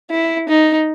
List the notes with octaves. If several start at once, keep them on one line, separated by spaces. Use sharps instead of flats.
E4
D#4